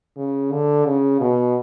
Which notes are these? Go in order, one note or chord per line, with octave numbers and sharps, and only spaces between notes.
C#3
D3
C#3
B2